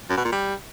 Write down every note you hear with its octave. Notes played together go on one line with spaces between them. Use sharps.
F#2
B2
A#2
G3